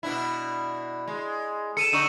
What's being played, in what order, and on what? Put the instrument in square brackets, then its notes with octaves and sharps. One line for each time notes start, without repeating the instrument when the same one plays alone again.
[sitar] B2 D4 E4
G#3
[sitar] A4 [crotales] C#7 D#7 E7
[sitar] D3 D4 D#4 [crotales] C#6 E6 D#7